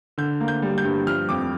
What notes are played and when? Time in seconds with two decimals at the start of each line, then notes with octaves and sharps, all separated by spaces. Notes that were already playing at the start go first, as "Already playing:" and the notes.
0.18 D3 G6
0.41 A#3
0.48 G6
0.62 G3
0.78 G6
0.84 G2
1.07 F3 F6
1.29 F2 D6